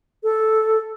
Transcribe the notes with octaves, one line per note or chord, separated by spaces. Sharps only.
A4